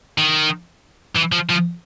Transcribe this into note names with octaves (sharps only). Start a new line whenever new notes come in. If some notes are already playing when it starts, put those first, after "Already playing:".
D#3
E3
F3
F3